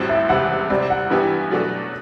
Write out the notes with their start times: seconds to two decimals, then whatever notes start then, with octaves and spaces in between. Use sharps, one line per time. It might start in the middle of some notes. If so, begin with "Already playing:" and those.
Already playing: A1 A2 G3 C4 F#4
0.09 E5
0.29 F#1 E2 C3 G3 F#5
0.70 C3 G3 C4 D5
0.90 F#5
1.10 G2 E3 B3 E4 G4
1.51 B2 F#3 A3 D4 F#4